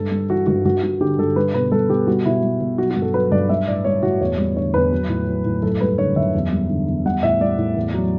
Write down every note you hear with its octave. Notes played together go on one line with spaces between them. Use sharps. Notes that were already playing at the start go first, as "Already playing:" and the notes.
Already playing: G2 A4
G3
E3 F#4
G2 F#4
G2 F#4
G3 F#4
D3 G4
G2 A4
G3 B4
B2 B4
G3 A4
B2 G4
G3 F#4
B2 E4
G3
B2
F#3 F#4
F#4
G2
A4
F#3 B4
G2 D5
G3 E5
A2 D5
G3 C#5
A2 F#4
E2 C#5
G3
D3 C#5
E2 B4
F#3
A2
F#3
A2
F#2 A4
G3 B4
D3 C#5
F#2 E5
E2
G3
D3
E2
G3 F#5
A2 E5
G3 D5
A2
E2
F#3